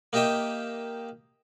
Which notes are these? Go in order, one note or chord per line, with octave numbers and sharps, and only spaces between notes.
A#3 D#4 G4 D#5 E5 G5